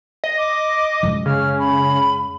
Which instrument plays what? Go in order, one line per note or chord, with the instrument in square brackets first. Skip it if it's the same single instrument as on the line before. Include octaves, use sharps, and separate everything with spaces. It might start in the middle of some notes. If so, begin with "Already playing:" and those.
[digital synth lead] D#5
[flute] D6
[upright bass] F#2 G#3
[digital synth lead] C#3 [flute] F6
[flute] B5